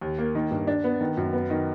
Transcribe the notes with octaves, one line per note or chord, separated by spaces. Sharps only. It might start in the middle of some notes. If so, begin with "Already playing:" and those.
D#2
A#3
D#3
G2
D4
B3
D#3
F#2
B3
D#3